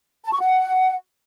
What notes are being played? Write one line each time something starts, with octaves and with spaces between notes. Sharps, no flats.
A5
C#6
F#5